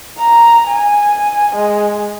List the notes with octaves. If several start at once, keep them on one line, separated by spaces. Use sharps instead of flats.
A#5
G#5
G#3